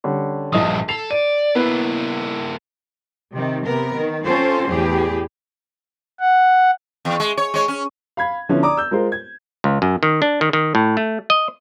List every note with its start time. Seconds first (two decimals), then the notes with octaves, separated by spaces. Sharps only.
0.04 D3 G3 C#4
0.53 A#1 G2 F3 D#5 D#6
0.89 A4 C7 F7
1.11 D5 D#7
1.55 A#3 B3 E4 B4
3.31 C3 D#3
3.64 C3 B3 A#4
3.94 D#3
4.25 C4 C#4 F4 A4 C5
4.69 E2 A2 G4 G#4
6.20 F#5
7.05 E2
7.20 G#3
7.38 C#5
7.54 G#3 C#5
7.68 C#4
8.17 F5 B5 G#6
8.49 D3 F3 B3 C#4 E4
8.62 D5 A#5 D6 D#6
8.77 E6 G6
8.91 G#3 F4 A#4 C5
9.12 G#6
9.64 C#2
9.82 F#2
10.03 D#3
10.22 D4
10.41 D#3
10.53 D#3
10.75 A2
10.97 A3
11.30 D#5